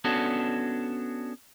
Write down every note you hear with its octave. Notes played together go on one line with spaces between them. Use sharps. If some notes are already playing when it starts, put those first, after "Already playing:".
B3 C#4 D4 F#4 A4